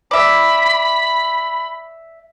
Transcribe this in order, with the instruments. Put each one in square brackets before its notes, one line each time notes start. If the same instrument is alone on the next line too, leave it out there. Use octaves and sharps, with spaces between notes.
[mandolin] D5 E5 [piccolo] B5